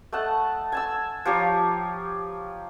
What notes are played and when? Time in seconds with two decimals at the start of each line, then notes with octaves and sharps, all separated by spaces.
0.12 A3 D#5 F#5 A5
0.72 G#5 A5 E6
1.25 F3 G4 C#5 A#5